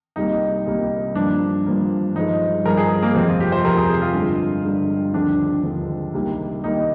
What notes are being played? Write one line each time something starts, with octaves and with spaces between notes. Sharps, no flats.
C2 C3 G3 A#3 D#4
C2 C3 G3 A#3
G2 F3 A#3 D4
G2 F3 A#3
G2 F3 G#3 D#4
G2 F3 G#3 A#4
G#4
A#3
F1 F2 C3 F3 C4
F4
G4
C5
F1 F2 C3 F3 A#4
G#4
G#4
F4
G2 D3 G#3
G2 D3 G#3
D#2 D3 F3 G#3 D4
D#2 D3 F3 G#3
C2 C3 D#3 G3 A#3
C2 C3 D#3 G3 A#3 D#4